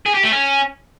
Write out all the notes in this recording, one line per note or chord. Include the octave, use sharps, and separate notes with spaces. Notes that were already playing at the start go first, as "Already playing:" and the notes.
G#4
G4
A3
C#4